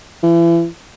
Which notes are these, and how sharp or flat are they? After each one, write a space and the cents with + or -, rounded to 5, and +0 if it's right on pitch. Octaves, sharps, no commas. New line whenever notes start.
E3 +35